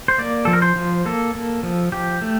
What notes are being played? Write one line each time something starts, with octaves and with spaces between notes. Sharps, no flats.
C5
A#3 D5
F3 A4
A#4
C5
F3
A#3 A4
A#3
F3
F3 G4
A3